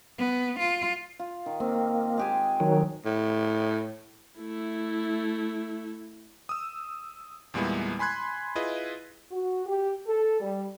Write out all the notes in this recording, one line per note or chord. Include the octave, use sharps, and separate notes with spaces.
B3
F4
F4
D#3
A#3 C4
G#3 G4 G#5
D#3 F#3
A2
A3 E4
D#6 E6
E2 A#2 G3 G#3 B3 E4
G#5 B5 C6 F#6 G#6
E4 F4 G#4 B4 D#5
F#4
G4
A4
G3